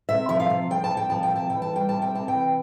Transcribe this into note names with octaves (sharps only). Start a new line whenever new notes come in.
C3 E5
F3 E5
F5
C3
F3 G5
A5
C3
G5
F3 A5
G5
C3 A5
E3 G5
A5
G3 G5
C3 A5
G5
C3 A5
G5
E3